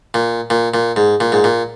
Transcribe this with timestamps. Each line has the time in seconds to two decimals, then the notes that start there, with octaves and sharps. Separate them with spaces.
0.14 A#2
0.50 A#2
0.74 A#2
0.96 G#2
1.20 A#2
1.32 G#2
1.44 A#2